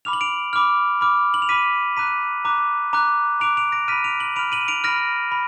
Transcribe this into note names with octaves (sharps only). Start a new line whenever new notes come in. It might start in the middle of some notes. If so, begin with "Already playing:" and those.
B5 D6 F6 F7
F#7
D7 F7
B5 D6 F6
B5 D6 F6
F#7
F7
B5 D6 F6 B6 D#7
A#5 D6 F#6 B6 D#7
A#5 D6 F#6
A#5 D6 F#6
A#5 D6 F#6 D7 F7
D7 F7
A#6 D7
B5 F6 B6 D#7
D7 F7
D#7 F#7
B5 F6 D7 F7
D#7 F#7
D7 F7
B5 F6 A#6 D7
B5